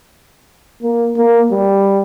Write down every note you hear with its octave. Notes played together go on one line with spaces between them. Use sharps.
A#3
A#3
G3